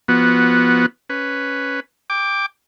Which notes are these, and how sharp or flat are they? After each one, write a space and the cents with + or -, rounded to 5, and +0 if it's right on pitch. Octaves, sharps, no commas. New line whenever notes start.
F3 -15 B3 -10 F#4 +0
C#4 +0 B4 +0
G5 +25 D6 +0